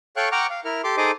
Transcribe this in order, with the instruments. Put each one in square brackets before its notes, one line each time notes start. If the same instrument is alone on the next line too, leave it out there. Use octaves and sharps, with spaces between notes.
[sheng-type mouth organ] A4 C#5 F5 G5 C#6 F#6
F#5 G5 A#5 C#6 D6 F6
F5
E4 A#4 F6
G4 A4 C6 D6
D#4 G#4 A4 C5 D#5 D6